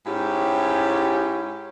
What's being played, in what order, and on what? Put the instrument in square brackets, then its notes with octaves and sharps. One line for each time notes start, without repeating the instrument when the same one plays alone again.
[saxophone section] G#2 C#4 E4 G4